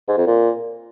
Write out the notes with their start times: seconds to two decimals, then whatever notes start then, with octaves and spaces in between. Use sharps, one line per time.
0.08 G#2
0.17 F2
0.27 A#2